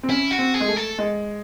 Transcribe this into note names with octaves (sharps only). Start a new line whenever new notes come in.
C4
C#4 E4
F#4
C4
G#4
G#3
A3
A4
G#3